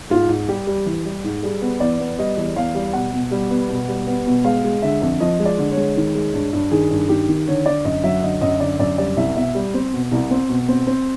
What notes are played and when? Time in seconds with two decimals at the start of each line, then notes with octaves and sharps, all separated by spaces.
0.10 G#2 F4
0.29 G#2
0.48 G3 G4
0.67 G3
0.86 E3
1.05 G3
1.24 G#2
1.43 G3 G#4
1.62 B3
1.80 E2 D5
1.99 B3
2.19 G3 D#5
2.37 E2
2.56 E2 F5
2.75 G3
2.93 B2 F#5
3.13 B2
3.31 G3
3.50 B3
3.69 B2
3.88 G3
4.07 B3
4.27 B2
4.44 G#3 F5
4.64 G#3
4.82 D3 E5
5.02 F2
5.20 F3 D#5
5.40 G#3
5.46 D5
5.58 D3
5.71 C#5
5.77 G#3
5.97 D#3
6.15 G#3
6.33 G2
6.53 G2
6.71 D#3 G#4
6.91 G2
7.09 D#3 G4
7.28 D#3
7.47 D3 C#5
7.66 D3 D5
7.85 F#2 D#5
8.03 F#3 E5
8.22 D3 D#5
8.41 F#2 D#5
8.60 D3 D5
8.80 F#2 D5
8.98 G3 D5
9.16 C2 E5
9.35 B2 E5
9.55 G3
9.74 C4
9.93 B2
10.12 C2
10.31 C4
10.49 B2
10.68 C4
10.87 C4